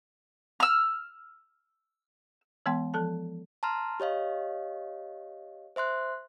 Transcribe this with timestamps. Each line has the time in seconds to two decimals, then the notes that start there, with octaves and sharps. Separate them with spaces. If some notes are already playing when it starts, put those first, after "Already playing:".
0.60 E6 F6
2.66 E3 G#3 B3 G5 C6
2.94 F3 A4 A5
3.63 A5 A#5 C6 F6
4.00 G4 C#5 D#5 F5
5.76 C5 E5 C6 F#6